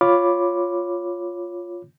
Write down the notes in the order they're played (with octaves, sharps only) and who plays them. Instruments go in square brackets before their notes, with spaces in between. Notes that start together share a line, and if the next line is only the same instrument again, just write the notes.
[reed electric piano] F4 C#5 B5 D6